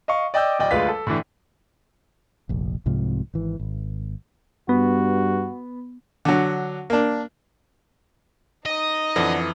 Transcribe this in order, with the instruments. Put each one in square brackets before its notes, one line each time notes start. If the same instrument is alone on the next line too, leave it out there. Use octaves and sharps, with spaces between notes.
[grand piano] D#5 F5 C#6
D5 D#5 G5 D6 E6 G6
D1 D5 D#5 G5
D2 G#3 F4 B4 F5 B6
A4
A2 D3 E3
[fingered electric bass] F1 A#1
C2 G#2 C3 F3
G#1 E3
G#1
[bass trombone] G2 [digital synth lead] B3 [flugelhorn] F#4
[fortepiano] D3 F#3
A#3 D4
[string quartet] D#4 D#6 [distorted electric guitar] D#5
[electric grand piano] F2 E3 [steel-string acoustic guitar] D3